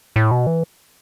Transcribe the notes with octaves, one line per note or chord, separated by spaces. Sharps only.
A2
B2
E3